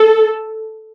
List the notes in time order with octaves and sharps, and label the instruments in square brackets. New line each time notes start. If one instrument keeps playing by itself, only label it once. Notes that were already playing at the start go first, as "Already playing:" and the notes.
Already playing: [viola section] A4